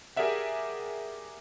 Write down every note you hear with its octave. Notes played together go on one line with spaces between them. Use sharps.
G4 G#4 A#4 D5 E5 F#5